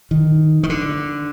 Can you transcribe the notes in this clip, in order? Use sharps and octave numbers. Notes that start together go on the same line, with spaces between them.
D#3
D#3
D3